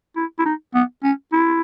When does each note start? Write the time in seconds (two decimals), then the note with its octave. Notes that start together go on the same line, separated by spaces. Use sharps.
0.16 E4
0.39 E4
0.46 D#4
0.74 B3
1.04 C#4
1.33 E4